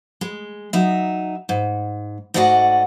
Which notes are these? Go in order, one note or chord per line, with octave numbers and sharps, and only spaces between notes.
G#3
F#3 D#4 E5
G#2
G#2 A3 F#4 D5 D#5 F#5